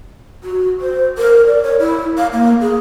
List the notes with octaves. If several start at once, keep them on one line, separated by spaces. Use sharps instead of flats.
F#4
C5
A#4
D5
C#5
E4
F5
A#3
G#4